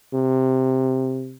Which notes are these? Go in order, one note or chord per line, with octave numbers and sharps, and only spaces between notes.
C3